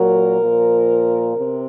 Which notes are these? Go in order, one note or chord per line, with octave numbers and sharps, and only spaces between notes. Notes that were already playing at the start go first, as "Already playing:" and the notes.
Already playing: A#2 F#3 A#4
A#2 F3
C3